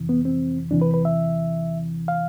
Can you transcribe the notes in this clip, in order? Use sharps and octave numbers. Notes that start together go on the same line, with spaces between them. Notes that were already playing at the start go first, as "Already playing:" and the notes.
Already playing: F2 C3 E3
B3
C4
E2 C3 E3 D4
B4
B4
E5
F5